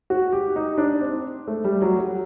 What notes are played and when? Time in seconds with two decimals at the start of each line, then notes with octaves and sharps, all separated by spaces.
0.10 F#4
0.33 G4
0.56 D#4
0.78 D4
1.01 C4
1.48 A3
1.65 G3
1.82 F#3
1.99 F#3